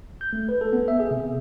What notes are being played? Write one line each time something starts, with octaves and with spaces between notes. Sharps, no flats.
G6
A3
B4
A4
B3
E5
G#4
C3